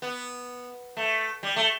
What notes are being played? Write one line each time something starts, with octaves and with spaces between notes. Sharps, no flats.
B3
A3
G3
A3